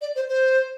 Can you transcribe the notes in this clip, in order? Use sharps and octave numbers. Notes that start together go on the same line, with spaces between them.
D5
C5
C5